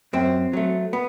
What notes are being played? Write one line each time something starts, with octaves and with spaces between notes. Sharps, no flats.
F#2 C4
F#3 A3
B3